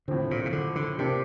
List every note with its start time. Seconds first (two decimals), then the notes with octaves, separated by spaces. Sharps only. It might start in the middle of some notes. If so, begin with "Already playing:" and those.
0.08 A2 D3 F3 C4
0.31 A#2
0.45 C3
0.53 D3
0.76 D3
0.98 C3 F3 A#3 D4 G4 C5